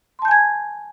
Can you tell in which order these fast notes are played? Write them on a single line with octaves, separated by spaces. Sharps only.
C6 A5 G6 G#5 G#6